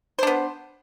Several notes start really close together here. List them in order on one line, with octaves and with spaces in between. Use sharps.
C5 D4 B3